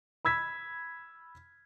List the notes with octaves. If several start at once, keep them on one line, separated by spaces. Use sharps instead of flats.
B5 E6 G#6 B6